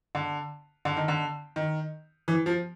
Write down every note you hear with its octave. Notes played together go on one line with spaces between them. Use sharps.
D3
D3
D#3
D3
D#3
E3
F3